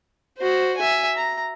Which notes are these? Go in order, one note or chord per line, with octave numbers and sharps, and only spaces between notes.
F#4 C5
E5 G#5
A#5